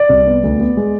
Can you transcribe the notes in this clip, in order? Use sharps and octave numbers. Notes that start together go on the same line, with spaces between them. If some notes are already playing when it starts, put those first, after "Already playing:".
Already playing: D5
C2
B3
D2
B3
G#3